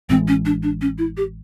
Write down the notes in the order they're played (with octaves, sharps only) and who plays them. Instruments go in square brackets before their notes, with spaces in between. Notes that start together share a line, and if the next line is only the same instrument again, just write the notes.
[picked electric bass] A1 A2 E3 G#3 [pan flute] C4
[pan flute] C#4
D4
D4
C#4
E4
G4